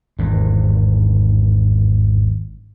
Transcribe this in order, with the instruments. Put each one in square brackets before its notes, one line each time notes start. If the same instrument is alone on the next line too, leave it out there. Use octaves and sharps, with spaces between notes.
[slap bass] G#1 E2 G2